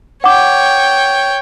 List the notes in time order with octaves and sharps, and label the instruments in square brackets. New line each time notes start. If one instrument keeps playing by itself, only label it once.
[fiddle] C#5 G5 [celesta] F#5 D6